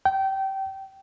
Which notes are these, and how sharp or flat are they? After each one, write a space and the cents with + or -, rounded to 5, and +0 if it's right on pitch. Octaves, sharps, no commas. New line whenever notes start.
G5 -20